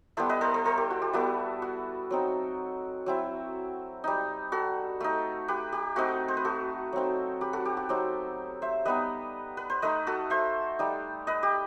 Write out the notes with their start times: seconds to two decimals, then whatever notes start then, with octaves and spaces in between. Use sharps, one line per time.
0.17 G3 B3 E4 A4 C5
0.29 B4 D#5
0.41 A4 C5
0.54 A4 C5
0.65 A4 C5
0.78 G4
0.90 F#4
1.02 G4
1.13 G3 B3 E4 F#4 A4
1.62 F#4
2.11 F#3 C4 D#4
3.06 F#3 C4 E4
4.04 G3 D#4
4.52 F#4 A4
5.00 A3 D#4
5.48 G4 B4
5.72 G4
5.96 A3 C4 D#4 F#4
6.28 C5
6.37 B4
6.45 F#4 A4
6.93 F#3 C4 D#4
7.41 G4 B4
7.53 F#4 A4
7.65 G4
7.77 F#4
7.89 F#3 C4 D#4 G4
8.62 C5 E5
8.85 G3 B3 D#4 B4 D#5
9.57 B4
9.70 C5
9.82 A3 D#4 B4 D#5
10.07 F#4 A4
10.30 C5 E5
10.79 G3 D#4
11.27 B4 D#5
11.43 G4